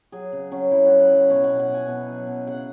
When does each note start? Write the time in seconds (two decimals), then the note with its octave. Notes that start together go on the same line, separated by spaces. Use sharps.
0.12 F#3 G#4
0.33 C#3
0.51 F#3 C#4
0.71 C#3 E4
0.86 F#3 F#4
1.00 B4
1.11 C#3 F#5
1.29 B2 C#5
1.44 F#5
1.49 B2
1.59 F#5
1.69 B2 G#5
1.88 B2
2.08 F#3
2.27 B2
2.47 C#3 F#5